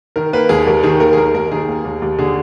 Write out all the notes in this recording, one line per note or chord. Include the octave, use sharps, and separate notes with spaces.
D#3 A#4
A#3 B4
D#2 G#4
D#2 A#4
D#3 G#4
A#3 A#4
G#4
D#2 A#4
D#2 A#4
D#3 G#4
A#3
D#2
D#2
D3 G#4